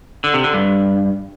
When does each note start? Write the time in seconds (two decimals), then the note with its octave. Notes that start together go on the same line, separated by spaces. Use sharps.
0.24 D3
0.34 C3
0.44 D3
0.54 G2